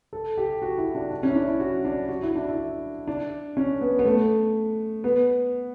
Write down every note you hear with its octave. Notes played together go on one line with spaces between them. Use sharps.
A4
G4
F#4
E4
D4
D4
C#4
E4
D4
E4
F#4
D4
F#4
E4
D4
E4
D4
C#4
B3
B3
A3
B3